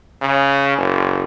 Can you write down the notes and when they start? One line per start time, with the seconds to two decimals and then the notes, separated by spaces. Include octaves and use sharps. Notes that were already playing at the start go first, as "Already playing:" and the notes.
0.22 C#3
0.78 F#1